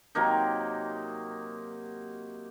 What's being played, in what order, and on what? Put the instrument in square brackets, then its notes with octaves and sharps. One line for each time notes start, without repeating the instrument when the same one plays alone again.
[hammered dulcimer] C3 F#3 A#3 D#4